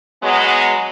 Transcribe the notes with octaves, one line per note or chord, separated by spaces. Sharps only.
F#3 G#3 B3